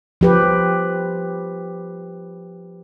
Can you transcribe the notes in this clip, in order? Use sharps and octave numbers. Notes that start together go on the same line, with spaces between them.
F3 G4 B4